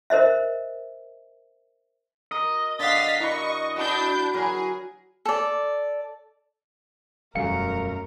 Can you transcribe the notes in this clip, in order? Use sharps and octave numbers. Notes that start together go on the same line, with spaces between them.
A#4 C5 D#5 E5
A#4 D#5
D3 F5 F#5 A6 B6
E4 A#4 B4 C#6
D4 F#4 B5 G6
F#3 G#4 A#4 B4
A4 D5
E1 F#2 G3 A3 F#4 A#4 F5 C#7